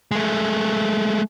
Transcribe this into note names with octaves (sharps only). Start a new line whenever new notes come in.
G#3 A3